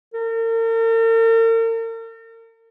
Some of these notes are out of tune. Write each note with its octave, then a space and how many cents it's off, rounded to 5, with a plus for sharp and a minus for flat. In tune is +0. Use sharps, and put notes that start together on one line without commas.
A#4 -45